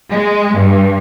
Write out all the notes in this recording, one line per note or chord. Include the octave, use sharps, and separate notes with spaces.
G#3
G2